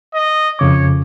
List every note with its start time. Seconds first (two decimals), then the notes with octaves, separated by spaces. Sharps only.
0.14 D#5
0.59 F2 C#3 C#5 D6